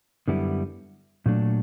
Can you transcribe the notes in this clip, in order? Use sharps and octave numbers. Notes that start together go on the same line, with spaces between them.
F#2 D3 G3 B3 E4
A#2 F#3 A3 D4